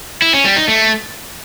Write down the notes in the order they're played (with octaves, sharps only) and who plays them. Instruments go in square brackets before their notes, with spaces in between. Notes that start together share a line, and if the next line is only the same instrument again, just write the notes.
[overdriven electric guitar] E4
C#4
G3
D#4
A3